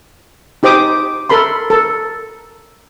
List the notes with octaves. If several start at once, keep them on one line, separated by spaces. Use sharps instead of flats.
D#4 G4 C5 D6 D#6
A4 A#4 B5 C6
A4 A#4